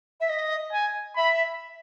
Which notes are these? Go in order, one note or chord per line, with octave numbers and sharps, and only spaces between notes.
E5
D#5
G#5
E5 B5